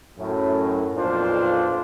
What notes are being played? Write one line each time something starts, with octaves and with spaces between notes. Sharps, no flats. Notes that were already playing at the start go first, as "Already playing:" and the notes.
F#2 A2
B1 F2 A#2 D4 F4 C5